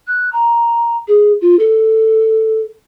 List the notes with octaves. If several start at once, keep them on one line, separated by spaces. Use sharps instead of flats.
F#6
A#5
G#4
F4
A4